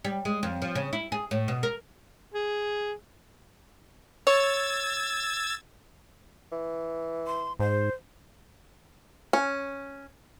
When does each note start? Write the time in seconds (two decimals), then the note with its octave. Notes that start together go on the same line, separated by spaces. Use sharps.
0.05 G3
0.25 G#3
0.43 F2
0.62 F3
0.75 C#3
0.93 E4
1.12 G#4
1.31 A2
1.48 B2
1.63 A#4
2.34 G#4
4.27 C#5 E6 G#6 A6
6.52 E3
7.27 C6
7.60 G#2 C5
9.33 C#4